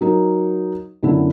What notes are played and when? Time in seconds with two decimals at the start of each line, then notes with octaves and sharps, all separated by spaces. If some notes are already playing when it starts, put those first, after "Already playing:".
0.01 F#3 D#4 A#4
1.03 F#2 D3 B3 E4